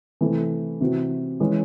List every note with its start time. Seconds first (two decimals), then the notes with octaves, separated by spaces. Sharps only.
0.21 C3 E3 A3 C4
0.81 C3 E3 C4 F#4
1.40 E3 G#3 C#4